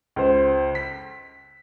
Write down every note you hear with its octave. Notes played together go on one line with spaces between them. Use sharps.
C#2 C5
B6